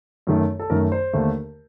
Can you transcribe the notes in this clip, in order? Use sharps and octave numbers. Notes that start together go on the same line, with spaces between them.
F#2 D#3 A3
A4
F#2 D#3 A3 A#4
C5
D#2 D3 A3